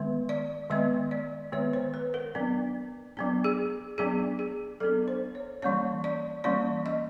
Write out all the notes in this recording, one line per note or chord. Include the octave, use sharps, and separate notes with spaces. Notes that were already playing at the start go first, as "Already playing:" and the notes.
Already playing: D#3 G#3 B3
D5
D#3 G#3 B3 D#5
D5
D#3 G#3 B3 C#5
C5
B4
A#4
F#3 B3 D4
F#3 B3 D4
G#4
F#3 B3 D4 G#4
G#4
F#3 B3 D4 A4
C5
C#5
E3 G3 A#3 C#4 C#5
D5
E3 G3 A#3 C#4 D5
D#5